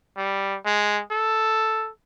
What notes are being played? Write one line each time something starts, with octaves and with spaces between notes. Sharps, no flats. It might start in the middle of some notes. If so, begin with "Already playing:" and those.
G3
G#3
A4